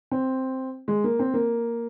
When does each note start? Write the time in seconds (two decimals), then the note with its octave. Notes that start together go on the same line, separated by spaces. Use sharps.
0.11 C4
0.88 G#3
1.04 A#3
1.19 C4
1.34 A#3